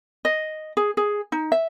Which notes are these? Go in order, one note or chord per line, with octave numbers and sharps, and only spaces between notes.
D#5
G#4
G#4
D#4
E5